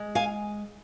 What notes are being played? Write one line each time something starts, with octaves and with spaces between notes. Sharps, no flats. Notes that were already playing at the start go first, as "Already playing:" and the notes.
Already playing: G#3
F5 G#5